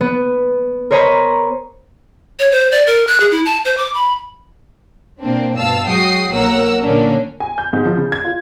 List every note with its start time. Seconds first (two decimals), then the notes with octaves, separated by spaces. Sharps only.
0.01 B3
0.91 A#4 C5 C#5 D#5 A#5 B5
2.39 C#5
2.52 C5
2.72 D5
2.87 A#4
3.07 F#6
3.20 G#4
3.31 E4
3.45 A5
3.65 C5
3.77 D6
3.94 B5
5.20 B2 A#3 C4 D4
5.57 G2 B2 F5 A5 E6
5.87 F#3 G#3 F#4 G5 D#6 C7
6.32 B1 A#3 A#4 C#5 F#5 E6
6.82 A#2 D3 A#3 C#4 D4
7.40 G#5
7.58 G6
7.73 G#2
7.85 F3
7.97 C#3
8.12 G#6
8.24 F4